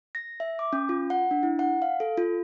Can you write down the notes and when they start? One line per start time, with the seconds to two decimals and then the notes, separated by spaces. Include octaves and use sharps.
0.15 A#6
0.40 E5
0.59 D6
0.73 C#4
0.89 F4
1.10 F#5
1.31 D4
1.43 E4
1.59 F#5
1.82 F5
2.00 A4
2.17 F4